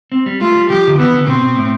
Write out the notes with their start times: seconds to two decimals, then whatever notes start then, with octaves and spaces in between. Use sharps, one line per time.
0.12 C4
0.26 G3
0.41 A3 F4
0.55 G3
0.69 F3 G4
0.87 D3
0.98 E3 B3
1.14 D3
1.27 B2 C4
1.41 B2
1.57 A2